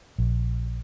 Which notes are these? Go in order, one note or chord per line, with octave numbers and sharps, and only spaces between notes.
A#1